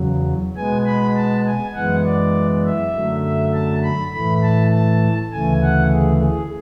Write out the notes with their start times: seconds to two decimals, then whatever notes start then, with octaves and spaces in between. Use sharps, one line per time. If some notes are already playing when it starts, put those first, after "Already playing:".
Already playing: E2 C#3 F#3
0.56 B2 G#3 B3 G#5
0.86 B5
1.16 A5
1.46 G#5
1.75 F#2 E3 G#3 B3 F#5
2.05 D5
2.65 E5
2.94 F#2 D3 F#3 A3
3.24 E5
3.54 A5
3.83 B5
4.13 A2 E3 A3 B5
4.43 A5
4.73 A5
5.32 D2 C#3 E3 A3 G#5
5.62 F#5
5.92 G#4
6.22 G#4